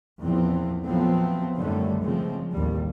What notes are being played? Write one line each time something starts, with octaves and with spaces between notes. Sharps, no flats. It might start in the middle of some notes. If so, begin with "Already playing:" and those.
E2 A#2 E3 F3 C4
F3 F#3 A3 B3 C4
F#2 D3 D#3 F#3 G3 A3
C#3 F3 G#3 C4
A1 D#2 G3